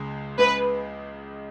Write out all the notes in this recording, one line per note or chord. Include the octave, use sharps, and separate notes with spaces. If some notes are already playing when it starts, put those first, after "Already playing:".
Already playing: C#2 C#3 G#3
C#2 C#3 G#3 B4